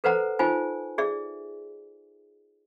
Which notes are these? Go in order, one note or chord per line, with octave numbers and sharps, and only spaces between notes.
A4 B4 C5 F#5 A#5
D#4 F4 C5 G#5
G#4 D5 E5